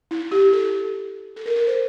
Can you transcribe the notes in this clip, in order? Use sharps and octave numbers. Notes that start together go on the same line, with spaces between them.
E4
G4
A4
A4
A#4
A#4
C5